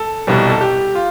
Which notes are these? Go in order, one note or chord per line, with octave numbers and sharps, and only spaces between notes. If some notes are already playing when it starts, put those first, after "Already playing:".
Already playing: A4
C2 B2 G3
A4
G4
F4